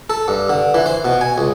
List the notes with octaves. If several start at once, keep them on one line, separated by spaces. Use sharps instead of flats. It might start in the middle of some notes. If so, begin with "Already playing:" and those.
A4
G2
D3
E3
C5
B2
G#5
C#2